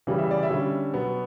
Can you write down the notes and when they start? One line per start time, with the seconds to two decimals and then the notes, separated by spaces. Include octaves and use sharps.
0.07 C#3 E3 G3
0.18 E5
0.31 D5
0.43 E5
0.50 D3 G3 C#4
0.93 B2 F#3 B3